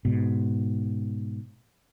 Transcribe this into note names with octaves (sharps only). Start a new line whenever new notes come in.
G#2 B2